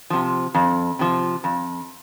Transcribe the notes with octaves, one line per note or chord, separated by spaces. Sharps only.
C3 F3
F2
C3 F3
F2